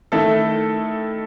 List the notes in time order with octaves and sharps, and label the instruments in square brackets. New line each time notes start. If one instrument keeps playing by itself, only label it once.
[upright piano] D#3 A3 E4 A4